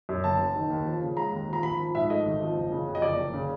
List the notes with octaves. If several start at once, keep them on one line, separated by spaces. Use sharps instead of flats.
F#2
F#1 A5
F#1
D#3
D#2
F3
C#3
G#3 A#5
D#2
F3 A#5
G#1 B5
F3
G#2 E5
A3 D#5
G#1
F3
F#1
C#3
F2
D#5
F#1 D5
F#1
C#3